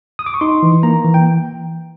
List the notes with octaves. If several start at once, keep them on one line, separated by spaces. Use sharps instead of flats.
D#6
D6
C#6
D#4 C6
E3
A#3 A#5
E3
G5